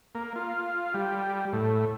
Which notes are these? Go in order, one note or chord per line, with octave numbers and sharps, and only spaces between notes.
A#3
F4
G3
A2